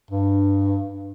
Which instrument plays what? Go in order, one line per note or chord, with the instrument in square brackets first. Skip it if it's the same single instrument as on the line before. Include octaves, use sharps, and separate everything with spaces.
[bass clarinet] G2